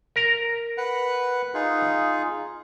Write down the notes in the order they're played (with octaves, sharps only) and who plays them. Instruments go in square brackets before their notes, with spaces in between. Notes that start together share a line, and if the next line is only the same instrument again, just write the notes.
[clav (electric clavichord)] A#4 A#5
[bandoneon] B4 F#5
D#4 F4 G#4